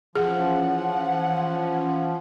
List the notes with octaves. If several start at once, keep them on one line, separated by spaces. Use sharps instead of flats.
E3 F3 C#4 G#4 F#5